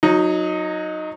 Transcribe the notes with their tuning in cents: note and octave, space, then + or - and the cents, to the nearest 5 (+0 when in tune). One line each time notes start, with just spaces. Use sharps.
F#3 -20 D#4 +0